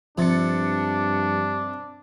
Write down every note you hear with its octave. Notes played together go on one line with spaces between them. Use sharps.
G2 C3 F3 D4 A6 C#7